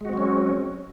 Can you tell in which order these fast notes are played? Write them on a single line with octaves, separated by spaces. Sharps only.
G#3 F#4 C4 F#3 C#4